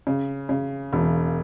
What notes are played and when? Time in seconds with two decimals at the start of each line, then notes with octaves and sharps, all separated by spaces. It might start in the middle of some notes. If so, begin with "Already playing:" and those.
0.07 C#3
0.49 C#3
0.93 E1